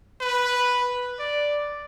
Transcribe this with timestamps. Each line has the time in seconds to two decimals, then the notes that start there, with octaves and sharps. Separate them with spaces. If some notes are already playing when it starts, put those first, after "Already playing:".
0.21 B4
1.19 D5